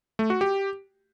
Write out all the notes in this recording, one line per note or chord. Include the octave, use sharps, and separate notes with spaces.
A3
F#4
G4